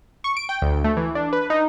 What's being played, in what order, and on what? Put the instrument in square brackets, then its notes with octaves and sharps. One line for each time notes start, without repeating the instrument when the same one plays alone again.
[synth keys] C#6
D7
G5
D2
A3
E3
D4
B4
D#4